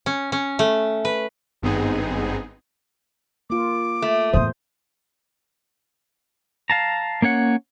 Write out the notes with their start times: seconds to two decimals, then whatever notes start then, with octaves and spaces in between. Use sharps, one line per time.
0.06 C#4
0.32 C#4
0.59 A3
1.05 B4
1.62 G#1 G2 B3 C4 D#4 G#4
3.50 A#3 F4 D6
4.02 A3
4.33 E2 A2 C5 D#6
6.70 F5 A5 A#5
7.22 A#3 C#4 C#5 F#5